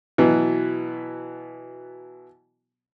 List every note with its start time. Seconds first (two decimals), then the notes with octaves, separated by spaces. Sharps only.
0.18 B2 E3 F#3 B3